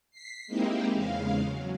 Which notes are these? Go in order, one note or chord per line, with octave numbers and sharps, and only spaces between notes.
B6 C7
G#3 A#3 C4 D#4 E4 G4
E2 C#3 G#3 F5
F#3